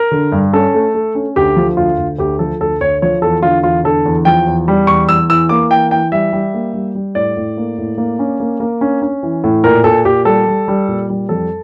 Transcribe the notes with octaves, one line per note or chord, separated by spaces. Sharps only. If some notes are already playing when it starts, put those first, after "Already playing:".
Already playing: A#4
D3
G2
C#4 A4
A3
A3
C#4
D2 G4
F3
D2 F4
D2
D2 G4
F3 A4
D2 A4
D2 C#5
F3 C#5
E2 A4
D3 F4
E2 F4
D3 A4
E2
F3 G5
E2
G3
E2 C#6
E2 E6
E3 E6
A#3 D6
E3 G5
E3 G5
G3 E5
G3
A#3
G3
G3
A2 D5
A2
A#3
A2
A#3
C#4
A#3
A#3
C#4
C#4
E3
A2
A#2 A#4
A#2 A4
A#2 G4
G3 A4
G3
G3
A#2
G3
F2 A4